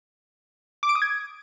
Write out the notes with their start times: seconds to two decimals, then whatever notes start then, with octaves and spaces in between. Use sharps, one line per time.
0.83 D6
0.89 D7
0.95 D#6
1.02 G#6